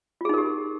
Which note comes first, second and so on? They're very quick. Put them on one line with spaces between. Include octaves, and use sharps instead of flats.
F4 G#4 D#4 A#4 G4